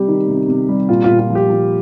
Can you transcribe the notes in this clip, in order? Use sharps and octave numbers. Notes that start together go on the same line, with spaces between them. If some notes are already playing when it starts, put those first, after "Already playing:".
Already playing: C3 G3 G4
D#3
C3
C3
G3
A#2 F4
F4
A#2
F4
F3
G4
F3